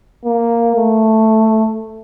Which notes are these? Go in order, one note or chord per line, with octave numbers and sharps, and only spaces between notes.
A#3
A3